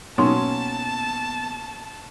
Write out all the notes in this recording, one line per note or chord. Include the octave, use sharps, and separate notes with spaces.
B2 F#3 A#3 B3 C#4 D#4 A5 C6